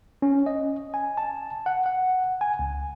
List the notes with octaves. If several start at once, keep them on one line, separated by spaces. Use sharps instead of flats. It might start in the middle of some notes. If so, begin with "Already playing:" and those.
C#4
D#5
G#5
A5
F#5
F#5
G#5
C#2